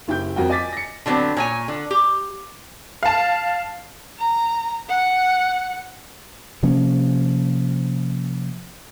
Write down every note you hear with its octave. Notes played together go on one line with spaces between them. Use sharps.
F#1 E4 G4 G5 G6
F2 F#4 A#4 G5
D#5 G#5 D6 A6 B6
A#6 C#7
D3 F#3 G3 B3 C4
A#2 C#5 G#5
D3
G4
F5 A5
A#5
F#5
C3 F3 A#3 C#4